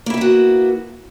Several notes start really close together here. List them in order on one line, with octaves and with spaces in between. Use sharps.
A#3 E4 E5 B3 F#4